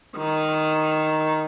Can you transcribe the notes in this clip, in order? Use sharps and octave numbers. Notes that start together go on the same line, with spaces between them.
D#3